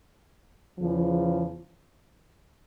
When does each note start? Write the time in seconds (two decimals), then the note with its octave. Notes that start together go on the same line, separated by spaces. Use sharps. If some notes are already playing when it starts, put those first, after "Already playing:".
0.79 E2 C#3 F3